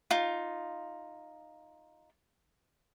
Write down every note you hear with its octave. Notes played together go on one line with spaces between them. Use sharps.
D#4 F4